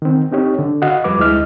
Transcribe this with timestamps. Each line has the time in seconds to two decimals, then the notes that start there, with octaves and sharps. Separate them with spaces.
0.02 D#3 C4
0.32 C4 D#4 G4 C#5
0.59 D3
0.82 F#4 D#5 F5 F#5
1.04 F2 F3 G3 B4 D6
1.19 D2 G#3 E4 D#5 F6